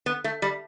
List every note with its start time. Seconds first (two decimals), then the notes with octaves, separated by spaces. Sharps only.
0.06 B3
0.24 A3
0.42 G3